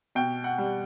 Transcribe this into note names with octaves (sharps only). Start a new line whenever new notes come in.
B2 G5
F#5
G3